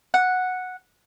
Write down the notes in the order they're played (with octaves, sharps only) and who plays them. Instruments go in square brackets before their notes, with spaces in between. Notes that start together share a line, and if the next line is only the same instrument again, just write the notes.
[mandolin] F#5